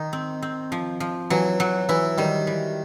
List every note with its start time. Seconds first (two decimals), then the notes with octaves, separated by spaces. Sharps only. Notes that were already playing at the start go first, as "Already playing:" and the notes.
Already playing: D#3 D#4
0.13 C4
0.42 C4
0.72 F3
1.00 F3
1.30 E3 F#3
1.60 F#3
1.89 E3 E4
2.18 D#3 G3
2.47 E3